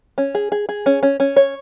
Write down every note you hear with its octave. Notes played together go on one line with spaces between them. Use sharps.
C#4
G#4
G#4
G#4
C#4
C#4
C#4
C#5